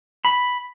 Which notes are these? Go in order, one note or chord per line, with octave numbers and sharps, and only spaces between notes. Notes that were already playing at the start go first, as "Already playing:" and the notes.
B5